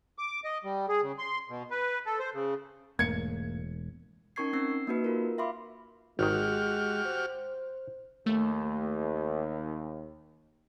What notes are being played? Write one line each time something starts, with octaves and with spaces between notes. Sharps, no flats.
D6
D#5
G3
G#4
C#3
C6
B2
B4
A4
C5
C#3
E1 G#2 A3 A#3 G#6 C#7
C#4 D#4 A#4 C#6 G#6 C7
C4 E6 C7
A#3 D#4 F#4 B4
F4 A#4
E5 F5 B5 C6 D6
G#1 D#3 G#3 F#4 G4 F6
C5
D#2 A3